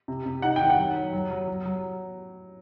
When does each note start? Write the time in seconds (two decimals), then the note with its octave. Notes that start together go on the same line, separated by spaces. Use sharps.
0.08 C3
0.26 C3
0.42 D#4 F#5
0.56 D#3 G5
0.70 F#5
0.78 F#3
0.95 F#3
1.13 F#3
1.31 F#3
1.48 F#3
1.65 F#3